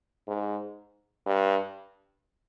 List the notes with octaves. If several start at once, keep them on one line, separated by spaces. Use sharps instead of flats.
G#2
G2